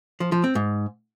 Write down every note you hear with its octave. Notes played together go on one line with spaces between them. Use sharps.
F3
F3
C4
G#2